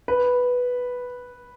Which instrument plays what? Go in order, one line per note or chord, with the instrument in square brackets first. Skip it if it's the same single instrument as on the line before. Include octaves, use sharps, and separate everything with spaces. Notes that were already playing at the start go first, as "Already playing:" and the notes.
[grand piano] B4